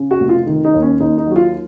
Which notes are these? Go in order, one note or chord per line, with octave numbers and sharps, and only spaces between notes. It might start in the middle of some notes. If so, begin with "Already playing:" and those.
Already playing: C#3
F#4
F1
F4
D#3
D#4
D#2
C#4
D#2 D#4
D#4
F#3 F#4
F4